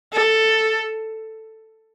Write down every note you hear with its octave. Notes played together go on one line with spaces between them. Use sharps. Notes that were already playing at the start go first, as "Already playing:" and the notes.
A4